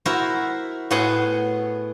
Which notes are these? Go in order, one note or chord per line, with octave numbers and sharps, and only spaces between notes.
E4 F#4 A#4 C5
A2 B3 F#4 G#4 F#5 C6